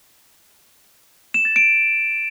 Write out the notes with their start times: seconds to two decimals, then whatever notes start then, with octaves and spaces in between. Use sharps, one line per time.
1.34 E7
1.45 A6
1.56 D7